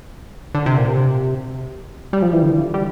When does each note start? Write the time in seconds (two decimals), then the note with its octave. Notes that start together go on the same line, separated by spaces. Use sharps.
0.55 D3
0.66 C3
0.78 A#2
0.88 C3
2.13 G3
2.22 F3
2.33 E3
2.43 D3
2.74 G3